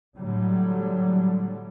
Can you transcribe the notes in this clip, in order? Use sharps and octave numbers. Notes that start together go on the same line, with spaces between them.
A2 D3 F#3 G3